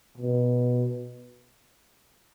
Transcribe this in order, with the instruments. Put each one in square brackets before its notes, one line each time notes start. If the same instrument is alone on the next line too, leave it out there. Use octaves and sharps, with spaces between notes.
[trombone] B2